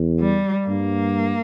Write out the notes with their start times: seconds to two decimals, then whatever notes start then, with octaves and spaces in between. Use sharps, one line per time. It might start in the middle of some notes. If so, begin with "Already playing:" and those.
Already playing: E2
0.20 G3
0.68 G2 A#3